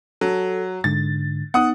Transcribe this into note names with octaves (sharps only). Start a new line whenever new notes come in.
F#3 A4
G#2 D3 A6
B3 D#4 F#5 D#6